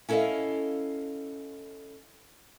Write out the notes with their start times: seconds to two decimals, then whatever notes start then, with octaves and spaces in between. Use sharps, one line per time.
0.09 C#4 E4 A4 B4 D#5 F5